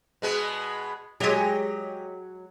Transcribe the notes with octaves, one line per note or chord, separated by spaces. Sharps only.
B2 G#3 B3
F#3 G#3 G4 D#5